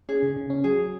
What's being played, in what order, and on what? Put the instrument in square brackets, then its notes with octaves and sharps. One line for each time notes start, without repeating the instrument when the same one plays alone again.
[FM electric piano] C#4 [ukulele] G#4
[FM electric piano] C#3
C#3
C#4
[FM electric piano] F#3 [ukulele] G#4
[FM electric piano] F#3